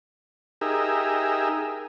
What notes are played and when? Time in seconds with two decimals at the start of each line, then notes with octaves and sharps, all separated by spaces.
0.61 D#4 G4 G#4 A#4 E5